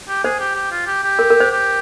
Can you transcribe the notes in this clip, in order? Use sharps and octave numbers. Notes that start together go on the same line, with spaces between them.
G4
G#4 C5
G4
G4
F4
G4
G4
A#4
A#4
C5
G4